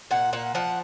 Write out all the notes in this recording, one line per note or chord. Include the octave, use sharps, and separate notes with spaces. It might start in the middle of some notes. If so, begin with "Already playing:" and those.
A#2 F#5
A#2 F#5
F3 F#5